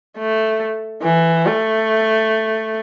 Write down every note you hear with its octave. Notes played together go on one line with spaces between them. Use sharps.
A3
E3
A3